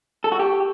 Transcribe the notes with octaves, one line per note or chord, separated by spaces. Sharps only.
A4
F#4
G4